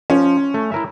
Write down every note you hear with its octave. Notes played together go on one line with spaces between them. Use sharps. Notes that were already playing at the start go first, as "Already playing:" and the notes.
F3 C#4
A3
E4 A#4 E5